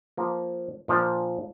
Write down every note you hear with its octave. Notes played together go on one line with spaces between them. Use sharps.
F3 A#3
A#2 F3 D4